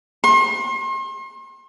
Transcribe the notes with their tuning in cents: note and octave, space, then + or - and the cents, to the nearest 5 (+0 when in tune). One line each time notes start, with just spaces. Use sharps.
C6 +40